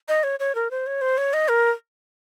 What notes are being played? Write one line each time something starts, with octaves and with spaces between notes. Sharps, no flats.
D#5
C#5
C#5
A#4
C5
C#5
C5
C#5
D#5
A#4